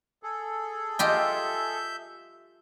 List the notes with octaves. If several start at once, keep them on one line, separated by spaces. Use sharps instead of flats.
G#4 A4
F4 G4 D#5 E5 G6